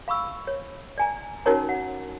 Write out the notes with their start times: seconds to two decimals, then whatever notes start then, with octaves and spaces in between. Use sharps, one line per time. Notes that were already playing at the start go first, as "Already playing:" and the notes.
0.08 F5 B5 C#6 E6
0.47 C#5
0.98 D5 G#5 A#5
1.46 C#4 D#4 F#4 A#4 C#5 A#5
1.69 F#5